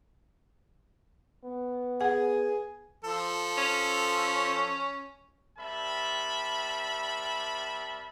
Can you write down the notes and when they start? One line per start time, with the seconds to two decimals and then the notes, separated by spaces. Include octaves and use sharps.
1.45 B3
2.01 G#4 F#5
3.05 F3 A4
3.58 C#4
5.58 G3 C4 A#4 E5 A5 B5